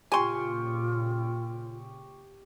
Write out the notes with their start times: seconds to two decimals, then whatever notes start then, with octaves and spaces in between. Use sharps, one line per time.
0.12 A#2 C#3 F4 G4 G#5 C6 C#6